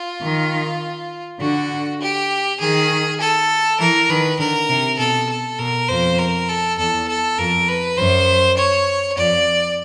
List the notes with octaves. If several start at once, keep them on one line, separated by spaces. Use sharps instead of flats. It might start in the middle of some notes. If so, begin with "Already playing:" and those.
Already playing: F4
D#3
D3 F#4
G4
D#3 G#4
A4
E3 A#4
D#3 B4
D3 A#4
C3
B2 A4
A4
B2 A#4
F2 C5
A#4
A4
E2 A4
A4
F2 A#4
B4
F#2 C5
C#5
F2 D5